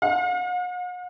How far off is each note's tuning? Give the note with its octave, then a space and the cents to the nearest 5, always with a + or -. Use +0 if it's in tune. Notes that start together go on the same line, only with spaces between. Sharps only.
F5 +45